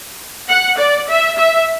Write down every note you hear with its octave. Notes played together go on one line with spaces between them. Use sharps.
F#5
D5
E5
E5